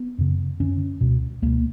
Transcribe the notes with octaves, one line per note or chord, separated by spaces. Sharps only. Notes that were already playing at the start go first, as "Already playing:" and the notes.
Already playing: B3
F#2 C#3
F#2 D3 C#4
C#2 B2
C#2 B2 A#3